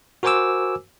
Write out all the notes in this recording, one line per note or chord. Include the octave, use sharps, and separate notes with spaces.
F#4 A#4 C5 G#5 D6 E6